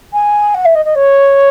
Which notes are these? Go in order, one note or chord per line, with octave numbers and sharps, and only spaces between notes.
G#5
F#5
E5
D#5
D#5
C#5